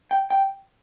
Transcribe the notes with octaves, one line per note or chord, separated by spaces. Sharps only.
G5
G5